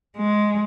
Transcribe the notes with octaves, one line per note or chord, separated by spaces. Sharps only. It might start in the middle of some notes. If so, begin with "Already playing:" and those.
G#3